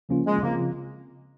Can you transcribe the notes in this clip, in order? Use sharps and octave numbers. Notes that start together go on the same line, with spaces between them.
C#3 F3 A#3 C#4 F4
G#3
C#3 F3 A#3 C4 F4